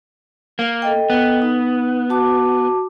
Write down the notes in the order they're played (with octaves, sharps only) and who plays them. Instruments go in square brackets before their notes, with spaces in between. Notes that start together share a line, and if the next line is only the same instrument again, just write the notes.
[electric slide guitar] A#3
[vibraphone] A4 D#5 G5
[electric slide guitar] B3
[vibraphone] D#4
F#4 A5 D6